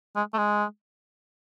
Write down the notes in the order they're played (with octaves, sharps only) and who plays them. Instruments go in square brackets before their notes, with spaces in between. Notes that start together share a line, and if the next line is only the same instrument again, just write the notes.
[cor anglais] G#3
A3
G#3